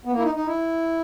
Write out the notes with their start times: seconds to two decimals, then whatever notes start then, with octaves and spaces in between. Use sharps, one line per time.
0.05 B3
0.12 A#3
0.18 E4
0.23 D#4
0.35 D#4
0.46 E4